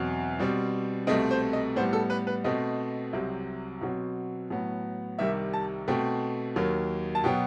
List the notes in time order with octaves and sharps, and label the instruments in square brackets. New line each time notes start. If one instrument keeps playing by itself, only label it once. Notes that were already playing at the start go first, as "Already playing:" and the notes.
Already playing: [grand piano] E2 B2 F#3 C4
B2 G3 C4
C2 B2 A3 C4 D#5
C5
D#5
A2 G3 B3 C5
A4
B4
B4
B2 A3 C4 D#5
C2 C3 F#3 C4
B2 F#3 C4
A2 F#3 B3
C2 C3 D#3 G3 E5
A5
B2 A3 C4 G5
D#2 D#3 F#3
A5
B2 F#3 B3 G5